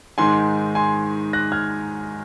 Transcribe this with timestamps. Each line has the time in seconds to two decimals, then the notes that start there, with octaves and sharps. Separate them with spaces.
0.18 G#2 D#3 G#3 G#5 C6
0.75 G#5 C6
1.33 F#6 A#6
1.52 F6 G#6